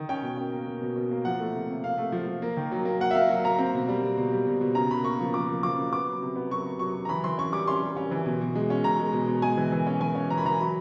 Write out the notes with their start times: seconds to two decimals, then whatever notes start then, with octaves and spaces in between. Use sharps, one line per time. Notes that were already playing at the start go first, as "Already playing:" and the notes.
Already playing: D#3
0.09 C#4 G5
0.23 B2
0.37 C#4
0.52 A#3
0.67 B2
0.82 B2
0.96 B2
1.11 A#3
1.25 F3 F#5
1.39 A3
1.55 C3
1.70 C3
1.84 C3 F5
1.98 A3
2.12 F3
2.27 F3
2.42 A#3
2.57 D#3
2.71 F#3
2.85 A#3
3.00 A#3 F#5
3.11 E5
3.14 A#3 F5
3.29 F#3
3.44 A#3 A#5
3.59 C4
3.74 B2
3.88 G3
4.03 B2
4.17 B2
4.32 G3
4.47 B2
4.61 B2
4.75 C#3 A#5
4.90 C#3 B5
5.04 A#3 C#6
5.20 F3
5.34 F3 D6
5.48 F3
5.63 F3 D6
5.78 C#3
5.92 B3 D6
6.08 F#3
6.22 C3
6.36 B3
6.50 F#3 C#6
6.65 C3
6.79 F#3 C#6
6.95 F#3
7.05 A#5
7.09 E3 B5
7.24 E3 C6
7.38 C#4 C#6
7.52 G3 D6
7.67 C#4 C6
7.82 G3
7.96 C#4
8.11 E3
8.26 B2
8.41 B2
8.55 G#3
8.70 C#4
8.84 B2 A#5
8.99 G#3
9.13 B2
9.28 B2
9.42 G#3 G#5
9.57 E3
9.72 E3
9.87 C#4
10.01 E3 G#5
10.15 C#4
10.30 E3 A#5
10.38 B5
10.45 E3 A#5
10.60 F#3 B5